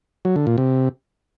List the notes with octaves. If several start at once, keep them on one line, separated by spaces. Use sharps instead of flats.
F#3
D3
A#2
C3